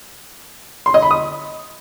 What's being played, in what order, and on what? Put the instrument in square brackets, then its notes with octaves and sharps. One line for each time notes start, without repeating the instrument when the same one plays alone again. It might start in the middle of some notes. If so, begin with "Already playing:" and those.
[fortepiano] C6
D#5
B5
D#6